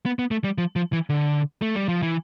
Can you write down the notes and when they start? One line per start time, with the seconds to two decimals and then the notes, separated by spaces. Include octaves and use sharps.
0.06 B3
0.19 B3
0.31 A3
0.44 G3
0.58 F3
0.76 F3
0.93 E3
1.10 D3
1.62 A3
1.76 G3
1.88 F3
2.02 E3